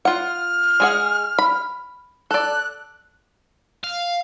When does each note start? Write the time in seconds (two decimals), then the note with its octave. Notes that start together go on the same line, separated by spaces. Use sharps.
0.05 F4 F#5 F6
0.80 G#3 G#4 F#5
1.38 B5
2.31 A4 D5 F#6
3.84 F5